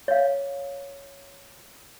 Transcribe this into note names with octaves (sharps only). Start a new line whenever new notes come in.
C#5 F5